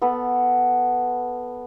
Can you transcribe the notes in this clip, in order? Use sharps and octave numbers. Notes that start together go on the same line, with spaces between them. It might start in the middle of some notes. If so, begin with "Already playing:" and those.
B3 A4